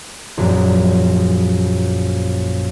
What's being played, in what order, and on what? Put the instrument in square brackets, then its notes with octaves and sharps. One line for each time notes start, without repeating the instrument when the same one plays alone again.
[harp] A#1 F#2